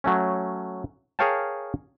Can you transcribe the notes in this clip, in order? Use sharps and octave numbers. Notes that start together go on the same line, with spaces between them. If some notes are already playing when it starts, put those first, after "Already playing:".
F#3 A3 C#4
G#4 A#4 C#5 F5 G5 A5